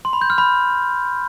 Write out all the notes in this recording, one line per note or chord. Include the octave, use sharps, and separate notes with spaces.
C6
B5
G6
F6
B5